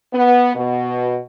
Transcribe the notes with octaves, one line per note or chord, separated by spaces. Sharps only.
B3
B2